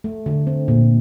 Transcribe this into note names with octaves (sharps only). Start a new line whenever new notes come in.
A3
D3
C4
A#2